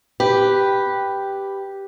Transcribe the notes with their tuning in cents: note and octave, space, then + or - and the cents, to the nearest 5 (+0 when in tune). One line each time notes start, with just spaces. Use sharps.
G4 +0 B4 +0